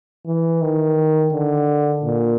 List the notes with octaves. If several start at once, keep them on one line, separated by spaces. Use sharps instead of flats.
E3
D#3
D3
A#2